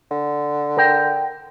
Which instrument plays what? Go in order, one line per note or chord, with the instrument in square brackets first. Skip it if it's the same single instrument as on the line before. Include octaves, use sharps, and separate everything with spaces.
[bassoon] D3
[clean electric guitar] A#4 G5